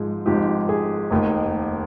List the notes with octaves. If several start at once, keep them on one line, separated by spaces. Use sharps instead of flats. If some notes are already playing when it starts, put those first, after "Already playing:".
Already playing: G#1 G#2 F3 G#4
G#1 G#2 F3 G4
G#4
F1 D#2 D#3